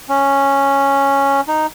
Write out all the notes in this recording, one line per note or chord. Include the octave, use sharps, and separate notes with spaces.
C#4
D#4